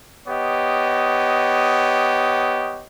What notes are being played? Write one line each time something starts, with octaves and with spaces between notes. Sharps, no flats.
B3 G4 C#5 D#5